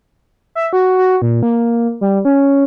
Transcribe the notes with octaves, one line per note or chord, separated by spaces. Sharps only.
E5
F#4
F#4
A#2
A#3
G3
C#4